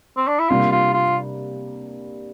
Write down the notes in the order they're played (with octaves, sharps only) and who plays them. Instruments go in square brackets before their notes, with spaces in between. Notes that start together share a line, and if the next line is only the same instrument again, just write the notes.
[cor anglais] C4
D4
E4
[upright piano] C3 G3 A#3 D4 [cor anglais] F4
[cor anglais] F4
F4